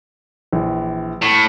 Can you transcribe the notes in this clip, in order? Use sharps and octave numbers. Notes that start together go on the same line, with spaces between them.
A#1 E3
A2